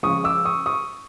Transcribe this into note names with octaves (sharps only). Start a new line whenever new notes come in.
C#3 F3 G#3 C#6 D#6
D6 E6
C#6 D#6
C#6 D#6